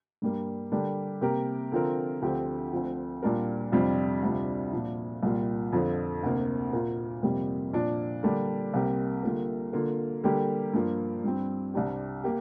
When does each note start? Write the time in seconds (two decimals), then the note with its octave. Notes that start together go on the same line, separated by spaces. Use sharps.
0.22 G2 G3 A#3
0.72 D3 G3 D4 G4 A#4
1.21 C3 A#3 G4 A#4
1.72 D3 F3 C4 F4 A#4
2.22 D2 D3 F3 C4 G4
2.73 D2 D3 F3 C4
3.22 A#2 G3 D4 F4 A#4
3.72 F2 C3 G3 D4 F4
4.22 D2 C3 G3 D4 F4
4.72 A#2 F3 D4
5.23 C2 A#2 G3 A#3 F4
5.73 F2 D3 F3
6.23 D2 C3 A#3
6.73 A#2 A#3 F4 A#4
7.23 F2 C3 G3 A#3 G4
7.73 A#2 F3 D4
8.23 D3 G3 A#3 D4
8.74 C2 C3 A#3 G4 A#4
9.23 D3 G3 A#3 F4 A#4
9.73 D3 A#3 F4
10.24 D3 G3 A#3 G4 A#4
10.74 G2 F3 A#3 F4
11.24 G2 G3 C4
11.74 C2 C3 G3 D4 G4
12.24 A#3 G4